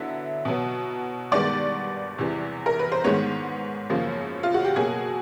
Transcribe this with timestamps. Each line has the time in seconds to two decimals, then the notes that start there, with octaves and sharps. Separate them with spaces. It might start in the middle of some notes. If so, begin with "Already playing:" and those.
Already playing: D3 F#3 B3 E4 E5
0.45 B2 F#3 B3
1.32 G2 D#3 G#3 B3 D5
2.18 E2 C3 E3
2.66 A#4
2.79 B4
2.92 C5
3.04 G#2 D#3 G#3 B3 C#5
3.90 F#2 C#3 F3 A#3
4.43 F4
4.54 F#4
4.65 G4
4.76 B2 F#3 A#3 G#4